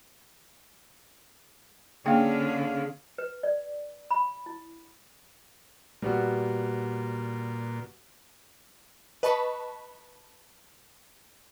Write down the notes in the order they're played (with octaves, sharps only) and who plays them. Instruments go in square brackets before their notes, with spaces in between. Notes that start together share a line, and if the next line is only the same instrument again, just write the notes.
[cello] D3 C#4 [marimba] A#3 D4 G5 [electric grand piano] G#4 F5
[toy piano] B4
D5
B5
E4
[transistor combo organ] A#2 [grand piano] G3 B3 F#4
[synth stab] B4 D#5 A5 B5 C#6